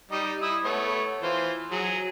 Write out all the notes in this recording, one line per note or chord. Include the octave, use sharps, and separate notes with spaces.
G3 D#4 D#5
E4 D#6 E6
A3 B3 C#5
E3 F4 C5
F#3 G#4